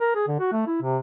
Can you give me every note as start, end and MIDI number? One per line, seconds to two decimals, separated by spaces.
0.01 0.12 70
0.15 0.23 68
0.27 0.37 50
0.40 0.51 66
0.52 0.65 57
0.67 0.81 64
0.82 0.97 48